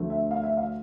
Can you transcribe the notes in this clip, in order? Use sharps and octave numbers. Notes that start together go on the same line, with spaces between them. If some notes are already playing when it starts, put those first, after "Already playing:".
Already playing: D2 D3 F3 A3
E5
F5
E5
F5